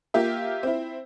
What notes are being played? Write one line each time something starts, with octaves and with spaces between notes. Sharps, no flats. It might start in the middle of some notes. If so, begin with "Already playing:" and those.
A#3 F4 G4 E5
C4 E4